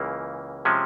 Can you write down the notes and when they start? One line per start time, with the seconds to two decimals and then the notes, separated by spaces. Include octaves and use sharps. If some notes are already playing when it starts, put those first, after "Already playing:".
Already playing: C#2 C#3 E3 A#3
0.65 C3 F3 G#3 C#4